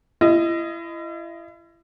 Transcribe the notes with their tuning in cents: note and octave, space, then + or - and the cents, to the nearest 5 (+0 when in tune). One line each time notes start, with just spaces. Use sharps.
E4 +35 D#5 +0